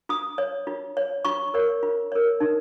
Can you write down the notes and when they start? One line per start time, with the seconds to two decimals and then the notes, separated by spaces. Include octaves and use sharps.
0.09 F4 D#6
0.38 C#5
0.67 F4
0.97 C#5
1.25 F4 C#6
1.54 A#4 C#5
1.83 F4
2.12 A#4 C#5
2.40 D#4